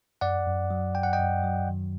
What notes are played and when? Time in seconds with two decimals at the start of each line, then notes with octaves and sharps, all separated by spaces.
0.21 F#2 D5 F#5
0.47 F#2
0.71 F#3
0.95 F#2 G5
1.03 F#5
1.13 D#5 G5
1.20 F#2
1.43 F#3
1.68 D#3